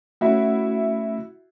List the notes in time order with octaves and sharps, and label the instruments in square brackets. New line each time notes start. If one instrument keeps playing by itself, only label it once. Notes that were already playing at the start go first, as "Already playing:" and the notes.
[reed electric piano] A3 C#4 [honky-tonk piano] E4 F#4